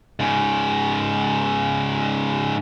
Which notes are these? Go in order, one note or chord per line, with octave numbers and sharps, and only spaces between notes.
G#2 C#3